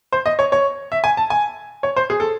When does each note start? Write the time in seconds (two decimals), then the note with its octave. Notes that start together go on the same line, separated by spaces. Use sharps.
0.12 C5
0.26 D#5
0.39 C#5
0.52 C#5
0.92 E5
1.04 G#5
1.17 A5
1.30 G#5
1.83 C#5
1.96 C5
2.10 G#4
2.20 A4